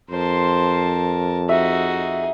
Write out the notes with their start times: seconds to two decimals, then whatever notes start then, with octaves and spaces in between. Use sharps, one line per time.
0.10 F2 A#4 C5 A5 C6
1.49 D#4 F#4 G#4 E5